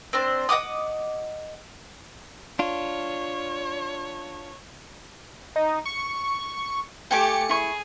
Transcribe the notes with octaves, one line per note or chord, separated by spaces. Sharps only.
C4 D4 C5
D#5 F#5 D6 D#6
D4 F4 C#5
D#4
C#6
A3 G4 G5 G#5 D6 C#7
E4 G#4 C#6